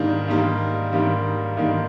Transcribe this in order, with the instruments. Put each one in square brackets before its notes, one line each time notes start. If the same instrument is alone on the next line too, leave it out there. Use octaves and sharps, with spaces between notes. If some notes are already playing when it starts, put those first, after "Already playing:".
Already playing: [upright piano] G#2 D#3 G3 A#3 D4
G#2 D#3 G3 A#3 D4
G#2 D#3 G3 A#3 D4
G#2 D#3 G3 A#3 D4